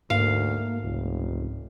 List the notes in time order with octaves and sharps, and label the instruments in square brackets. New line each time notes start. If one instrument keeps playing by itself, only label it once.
[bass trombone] D2 [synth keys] G#2 [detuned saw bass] A#3 [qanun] F5
[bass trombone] F1 [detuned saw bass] C#2